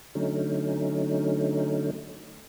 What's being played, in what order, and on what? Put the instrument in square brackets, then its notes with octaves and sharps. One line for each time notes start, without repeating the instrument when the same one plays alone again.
[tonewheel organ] D3 F#3 A3 C#4 D#4